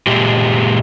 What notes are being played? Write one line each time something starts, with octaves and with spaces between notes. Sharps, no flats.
A#2 G#3 G4